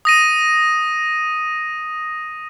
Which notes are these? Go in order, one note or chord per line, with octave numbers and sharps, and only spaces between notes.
D#6 A#6 D#7